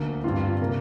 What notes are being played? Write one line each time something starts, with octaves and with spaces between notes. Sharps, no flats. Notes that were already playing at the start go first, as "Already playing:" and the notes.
Already playing: D2 D3 A#3
G2 G3 C4 F4
C3 A#3